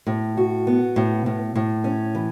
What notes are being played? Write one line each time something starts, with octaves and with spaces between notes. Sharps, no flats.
A2
F#4
B3
A2
A2
A2
C#4
E3